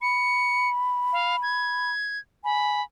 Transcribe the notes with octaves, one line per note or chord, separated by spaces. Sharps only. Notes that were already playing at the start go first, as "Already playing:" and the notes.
B5 C#7
F5
G#6
G#5 B5